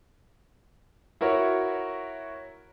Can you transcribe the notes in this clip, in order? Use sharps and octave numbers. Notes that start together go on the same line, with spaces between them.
E4 F#4 A#4 C#5 E5